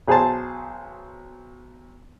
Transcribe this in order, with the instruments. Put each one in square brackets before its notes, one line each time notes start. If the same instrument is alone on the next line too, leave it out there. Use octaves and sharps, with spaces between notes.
[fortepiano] B1 G#4 C5 A5